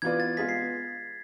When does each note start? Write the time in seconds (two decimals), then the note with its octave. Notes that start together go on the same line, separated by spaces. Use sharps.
0.02 E3 B3 F4 B4 D5 G#6
0.20 A6
0.37 G#3 B3 F4 G#4 B6
0.49 C7